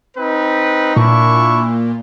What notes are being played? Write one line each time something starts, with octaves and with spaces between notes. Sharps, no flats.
C4 D#4 B4
A#2 D4 E4 C#6